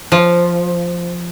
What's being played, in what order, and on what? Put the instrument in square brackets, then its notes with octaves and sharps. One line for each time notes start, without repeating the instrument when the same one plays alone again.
[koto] F3